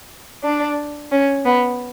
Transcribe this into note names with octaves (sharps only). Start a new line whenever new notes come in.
D4
C#4
B3